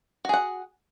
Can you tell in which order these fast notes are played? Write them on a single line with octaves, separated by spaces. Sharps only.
F#4 G#4 F#5